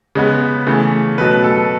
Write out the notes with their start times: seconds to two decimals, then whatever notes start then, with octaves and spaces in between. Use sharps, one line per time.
0.15 C#3 G#3 B3
0.67 C#3 E3 A3
1.18 B2 F#3 A3 B4
1.44 A4